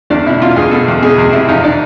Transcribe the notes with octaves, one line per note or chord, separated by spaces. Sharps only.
E2 D4
B2 E4
B2 F4
E2 G#4
B2 A4
E2
B2 G#4
E2
C3 E4
F2 D#4
D4